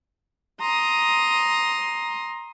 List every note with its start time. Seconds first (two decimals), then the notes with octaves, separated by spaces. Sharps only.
0.60 A#5 C6 D#6